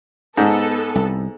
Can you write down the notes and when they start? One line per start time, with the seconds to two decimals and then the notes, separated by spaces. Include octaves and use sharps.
0.37 G#2 B3 A4
0.95 C2